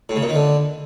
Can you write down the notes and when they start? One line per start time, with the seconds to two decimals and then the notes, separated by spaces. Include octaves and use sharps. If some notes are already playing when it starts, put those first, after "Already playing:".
0.09 A2
0.16 C#3
0.23 A#2
0.29 D#3
0.36 D3